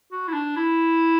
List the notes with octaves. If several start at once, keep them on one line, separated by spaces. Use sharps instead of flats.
F#4
E4
D4
E4